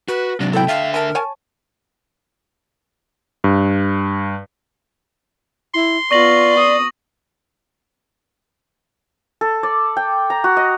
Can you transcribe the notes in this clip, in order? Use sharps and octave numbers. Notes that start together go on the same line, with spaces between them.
F#4 B4
C3 F#3 D4
E4 A4 G5
D3 E5 F5
A#4 G#5 A5
C#5 G#5 A5
G2
E4 C6
B3 F4 D5 C#6 A#6 F#7
D#6
A4
D5
G5
A#5
F#4
D#5